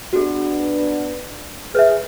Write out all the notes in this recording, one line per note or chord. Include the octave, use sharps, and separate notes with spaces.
B3 D4 F#4 G#4
G#4 B4 C#5 E5